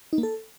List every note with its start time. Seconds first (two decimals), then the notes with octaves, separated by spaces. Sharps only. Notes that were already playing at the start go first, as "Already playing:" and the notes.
0.13 D#4
0.18 A#3
0.23 A4